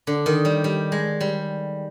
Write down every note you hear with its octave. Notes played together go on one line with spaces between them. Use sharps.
D3
D#3
G3
G3
G#3
G3